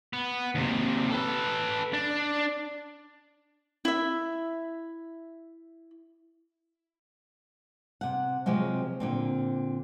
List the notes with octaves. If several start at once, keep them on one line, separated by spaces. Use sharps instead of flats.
B3
D#2 C3
A4 B4
D4
E4 E5
C3 F#5
C3 F3 F#3 G#3 C4
A#2 D3 C4